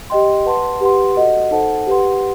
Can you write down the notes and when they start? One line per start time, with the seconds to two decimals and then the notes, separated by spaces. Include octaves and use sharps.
0.10 G4 D#5 G5 C6
0.46 B4 F#5 A5 C6
0.81 G4 B4 F#5 C6
1.16 F#4 A4 D#5 F#5
1.51 D#4 A4 C5 F#5 A5
1.87 G4 B4 F#5 C6